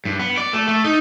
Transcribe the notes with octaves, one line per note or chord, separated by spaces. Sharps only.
G2
B3
D5
A3
A3
D#4